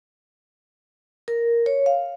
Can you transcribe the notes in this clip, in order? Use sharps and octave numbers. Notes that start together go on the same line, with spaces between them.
A#4
C#5
F5